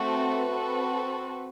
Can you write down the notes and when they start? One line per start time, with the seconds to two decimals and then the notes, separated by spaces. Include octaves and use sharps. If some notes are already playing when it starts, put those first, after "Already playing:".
Already playing: A3 C4 F#4 A4
0.10 B4
0.50 C4 F#4 A4